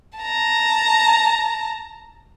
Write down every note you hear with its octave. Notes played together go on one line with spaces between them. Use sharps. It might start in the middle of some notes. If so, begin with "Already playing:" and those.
A5 A#5